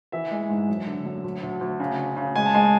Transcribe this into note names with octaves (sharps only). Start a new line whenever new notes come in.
E3 E5
G#3
G#2
F#2
D3
F#2
D2
D2
D2
C#3
C#3
C#3
G#3 G#5
A5
G#3 G#5